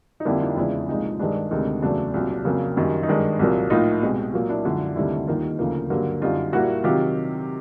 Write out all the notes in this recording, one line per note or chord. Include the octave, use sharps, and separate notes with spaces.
D#4
F2 D3 G3 A#3 D4 E4
D#4 F4
E2 C#3 F3 G#3 D4 E4
C2 A#2 F3 G#3 D#4
G2 D#3 G#3 D4
D2 C3 D#3 G#3
E2 C#3 F#3 A3 D4
C2 A#2 F#3
F2 C#3 F#3 A#3
F#2 D#3 G3
D#4
G2 D#3 G#3 D4
C2 A#2 F#3 A#3
A2 F3 A#3 D#4 F4
C2 B2 G#3
A#2 F#3 A#3
D4 E4
F#2 D3 F3 G#3
D2 C3 D#3 G3 D4 E4
D#2 D#3 G3 A#3 D#4 F4
D2 C#3 F3 A#3
G2 D3 F#3 A#3
F#2 D3 G3 D#4 F4
A#2 G3 A#3 E4 F#4
C3 D#3 F#3 F4 G4